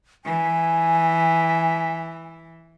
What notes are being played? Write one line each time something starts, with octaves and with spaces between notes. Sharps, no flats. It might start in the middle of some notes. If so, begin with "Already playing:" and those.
E3 G#5